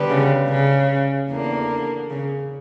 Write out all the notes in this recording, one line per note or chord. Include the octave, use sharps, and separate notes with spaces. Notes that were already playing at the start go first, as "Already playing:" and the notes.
Already playing: D3 G3 B3
C#3
C#3
E2 D3 A#3 D4
C#3